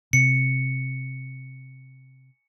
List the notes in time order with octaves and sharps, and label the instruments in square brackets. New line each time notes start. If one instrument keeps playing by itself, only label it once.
[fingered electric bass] C3 [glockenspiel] C#7